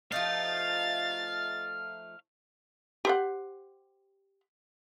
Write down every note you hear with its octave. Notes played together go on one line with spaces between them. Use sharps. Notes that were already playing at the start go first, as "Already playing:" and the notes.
F3 A3 D#4 F5 A6
G4 C5 F#5